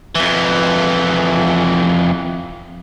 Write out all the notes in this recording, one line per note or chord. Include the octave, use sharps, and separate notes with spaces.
F2 E3